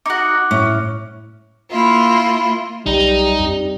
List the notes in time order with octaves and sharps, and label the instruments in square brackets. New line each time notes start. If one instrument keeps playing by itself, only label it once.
[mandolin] D#4 F#4 [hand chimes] D6 F#6
[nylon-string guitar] A2 [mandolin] C#4
[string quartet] A#3 E4 F4
[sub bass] B1 [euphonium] G3 [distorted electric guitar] D#4
[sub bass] F2 [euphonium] G3